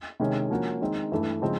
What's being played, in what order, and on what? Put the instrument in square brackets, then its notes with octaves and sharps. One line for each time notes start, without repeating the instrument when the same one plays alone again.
[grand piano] C3 D#3 G#3 C#4
F3 A#3 C#4 F#4
D#3 G#3 C4 D#4
G2 E3 A3
C#3 F3 G#3 C4 D#4